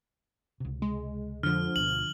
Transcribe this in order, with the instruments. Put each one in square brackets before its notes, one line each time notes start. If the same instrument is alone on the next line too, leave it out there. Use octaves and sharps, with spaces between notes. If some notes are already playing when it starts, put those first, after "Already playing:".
[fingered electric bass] C#2 C3
[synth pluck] G#3
[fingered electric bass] F2 [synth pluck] D3 F3 [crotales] F6
[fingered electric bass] D2 B2 [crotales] F#7